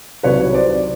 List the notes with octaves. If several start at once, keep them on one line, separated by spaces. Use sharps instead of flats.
C2 C3 D#3 F#3 B4 C#5
C5 D5